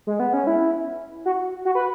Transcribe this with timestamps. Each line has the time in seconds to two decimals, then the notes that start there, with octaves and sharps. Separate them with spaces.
0.07 G#3
0.20 B3
0.33 C#4
0.47 E4
1.25 F#4
1.65 F#4
1.75 B4